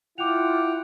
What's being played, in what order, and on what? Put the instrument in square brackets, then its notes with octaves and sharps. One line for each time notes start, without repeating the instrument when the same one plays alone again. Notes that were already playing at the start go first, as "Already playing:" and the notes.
[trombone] E4 [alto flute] F4 [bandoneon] F#5 G5 [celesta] D6 F7